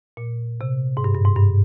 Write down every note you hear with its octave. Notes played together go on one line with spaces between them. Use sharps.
A#2
C3
G#2
G2
G2
G#2
G2